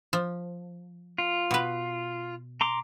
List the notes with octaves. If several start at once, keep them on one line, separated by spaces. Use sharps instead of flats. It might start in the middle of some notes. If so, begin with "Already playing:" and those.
F3
F4
B2 B4
A#5 C6 D6